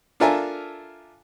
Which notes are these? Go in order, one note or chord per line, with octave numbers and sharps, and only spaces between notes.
D4 F4 A4 A#4 E5 G#5